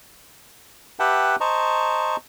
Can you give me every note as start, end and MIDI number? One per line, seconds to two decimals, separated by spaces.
0.99 1.36 67
0.99 1.36 71
0.99 1.36 76
0.99 1.36 78
0.99 1.36 79
0.99 1.36 81
1.40 2.16 72
1.40 2.16 75
1.40 2.16 81
1.40 2.16 82
1.40 2.16 85